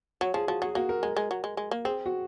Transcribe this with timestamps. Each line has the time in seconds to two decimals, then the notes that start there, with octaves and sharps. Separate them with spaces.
0.21 F#3 C#5
0.34 F3 G#4
0.48 F3 F#4
0.62 F#3 G#4
0.75 A#3 F#4
0.89 A#4
1.03 G#3 A#4
1.17 G#3
1.31 F#3
1.44 G#3
1.57 G#3
1.71 A#3
1.85 C4 G#4
2.06 F#4